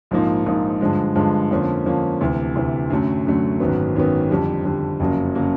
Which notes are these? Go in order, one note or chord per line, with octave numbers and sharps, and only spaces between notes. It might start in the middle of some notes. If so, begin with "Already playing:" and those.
A#1 G#2 F3 A#3 D#4
A#1 G#2 F3 A#3 D#4
G2 D3 F3 G#3
G2 D3 F3 G#3
F2 D3 F3 A#3 C#4
F2 D3 F3 A#3 C#4
D2 C3 E3
D2 C3 E3
F#2 D3 F#3 A3
F#2 D3 F#3 A3
G#1 F#2 D#3 F#3 B3
G#1 F#2 D#3 F#3 B3
F2 D3 G3
F2 D3 G3
F#1 F2 C#3 F#3 A#3
C#3 F#3 A#3